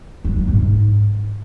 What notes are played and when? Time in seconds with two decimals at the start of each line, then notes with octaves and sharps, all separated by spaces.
0.24 F#3
0.36 F#3
0.48 G#2
0.60 G#2